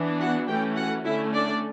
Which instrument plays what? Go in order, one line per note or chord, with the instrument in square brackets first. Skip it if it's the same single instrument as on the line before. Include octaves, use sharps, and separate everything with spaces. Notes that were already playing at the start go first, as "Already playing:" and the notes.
Already playing: [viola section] E3 B3 D4
F#4 F#5
E3 A3 C#4 G4 G5
F#4 F#5
D3 A3 C#4 E4 E5
D4 D5